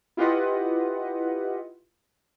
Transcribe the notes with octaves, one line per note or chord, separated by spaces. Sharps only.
E4 F4 G4 B4 D#5 F#5